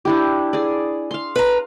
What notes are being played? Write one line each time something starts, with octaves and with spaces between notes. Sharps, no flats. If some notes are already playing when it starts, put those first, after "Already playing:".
D4 E4 G4
G#4 D5
F5 C6
B4 A#5